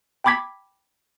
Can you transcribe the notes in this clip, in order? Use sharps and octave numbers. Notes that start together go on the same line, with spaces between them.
G5 A5 B5 D6 G#6 B6